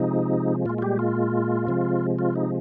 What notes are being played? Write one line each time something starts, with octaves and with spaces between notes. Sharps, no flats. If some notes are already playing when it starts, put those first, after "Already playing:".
Already playing: C3 F3 G#3 D#4
A#2 G#3 F4
F4
G3 G4
F4
C3 F3 G#3
F4
D#4